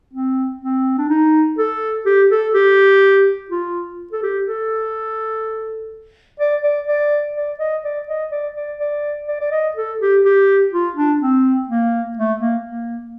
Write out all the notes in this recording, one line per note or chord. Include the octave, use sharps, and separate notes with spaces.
C4
C4
D4
D#4
A4
G4
A4
G4
F4
A4
G4
A4
D5
D5
D5
D5
D#5
D5
D#5
D5
D5
D5
D5
D5
D#5
A4
G4
G4
F4
D4
C4
A#3
A3
A#3
A#3